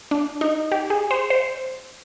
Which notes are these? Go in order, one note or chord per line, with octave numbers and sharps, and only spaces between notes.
D4
D#4
G4
G#4
C5
C5